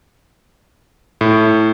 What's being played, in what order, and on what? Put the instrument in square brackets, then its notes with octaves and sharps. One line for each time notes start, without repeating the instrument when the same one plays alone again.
[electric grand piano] A2